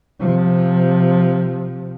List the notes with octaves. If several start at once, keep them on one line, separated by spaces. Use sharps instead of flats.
C3 F3